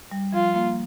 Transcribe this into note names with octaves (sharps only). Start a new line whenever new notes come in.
G3
F3 F4
A#3